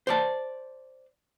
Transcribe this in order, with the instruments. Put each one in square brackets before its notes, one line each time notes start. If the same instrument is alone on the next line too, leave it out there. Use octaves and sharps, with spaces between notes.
[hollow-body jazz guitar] C5 D5 A5